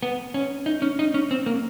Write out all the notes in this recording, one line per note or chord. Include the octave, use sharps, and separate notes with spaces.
B3
C#4
D#4
C#4
D#4
C#4
C4
A#3